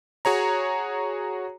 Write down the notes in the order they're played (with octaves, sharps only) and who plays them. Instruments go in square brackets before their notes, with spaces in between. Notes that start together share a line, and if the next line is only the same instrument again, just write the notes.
[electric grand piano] F#4 G#4 C#5 A#5